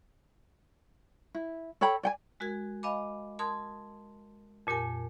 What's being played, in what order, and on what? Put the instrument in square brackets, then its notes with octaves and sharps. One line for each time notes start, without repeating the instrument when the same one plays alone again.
[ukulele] E4
A4 C#5 G5 B5
D5 G5 G#5
[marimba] G#3 F#4 A#4 G#6
D#5 F5 G#5 B5 D6
A#4 A5 C6 D#6 G#6
F2 A#2 G4 A#4 G#5